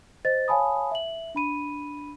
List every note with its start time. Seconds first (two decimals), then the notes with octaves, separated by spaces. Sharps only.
0.25 C5 D#5 A6
0.48 C#5 F5 G#5 A5 B5 D#6
0.91 E5 F#7
1.35 D4 B5 D#7